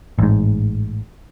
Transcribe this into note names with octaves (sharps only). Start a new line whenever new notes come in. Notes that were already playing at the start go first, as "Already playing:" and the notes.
A1 G#2